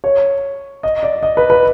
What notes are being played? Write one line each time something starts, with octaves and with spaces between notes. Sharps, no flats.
C#5
D#5
D5
D#5
B4
B4